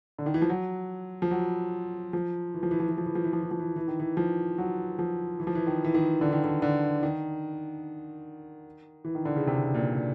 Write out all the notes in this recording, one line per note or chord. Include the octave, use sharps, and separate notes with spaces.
D3
D#3
E3
F3
F#3
F3
F#3
F3
E3
F3
E3
F3
E3
F3
E3
F3
E3
F3
E3
F3
E3
E3
D#3
E3
F3
F#3
F3
E3
F3
E3
D#3
E3
D#3
D3
D#3
D3
D3
D#3
E3
D#3
D3
C#3
C3
A#2